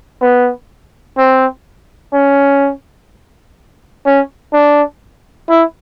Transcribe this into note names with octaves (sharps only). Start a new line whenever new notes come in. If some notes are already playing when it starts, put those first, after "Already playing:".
B3
C4
C#4
C#4
D4
E4